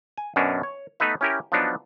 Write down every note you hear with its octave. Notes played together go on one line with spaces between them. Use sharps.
G#5
F#2 B2 C#4 D4
C#5
A3 B3 D#4 B4 E5
C#4 E4 G4 A#4
F3 F#3 B3 D4 D#4